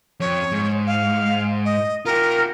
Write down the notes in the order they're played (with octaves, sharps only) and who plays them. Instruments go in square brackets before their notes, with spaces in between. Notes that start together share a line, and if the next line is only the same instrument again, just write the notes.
[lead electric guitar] F2 [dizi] C#5
[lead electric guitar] G#2
[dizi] F5
D#5
[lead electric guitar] F4 G4 [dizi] A#4